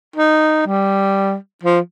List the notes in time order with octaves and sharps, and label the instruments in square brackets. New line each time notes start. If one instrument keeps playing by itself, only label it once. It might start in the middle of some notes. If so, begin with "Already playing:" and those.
[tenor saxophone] D#4
G3
F3